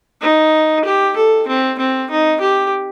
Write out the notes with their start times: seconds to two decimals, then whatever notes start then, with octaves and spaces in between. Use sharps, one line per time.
0.22 D#4
0.85 G4
1.16 A4
1.47 C4
1.79 C4
2.10 D#4
2.41 G4